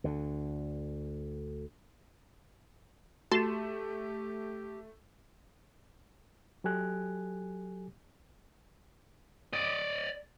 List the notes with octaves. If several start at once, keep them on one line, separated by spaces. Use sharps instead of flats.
D2 D3
A3 F#4 G4 A5 C6 A#6 E7
F#3 G4 A4 G#5 F#6
D5 D#5